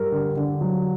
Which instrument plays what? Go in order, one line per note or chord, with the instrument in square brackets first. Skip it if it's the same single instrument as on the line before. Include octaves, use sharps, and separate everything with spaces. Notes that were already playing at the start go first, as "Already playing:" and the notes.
Already playing: [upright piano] G3 [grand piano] A#4
[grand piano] D3
D3
F#3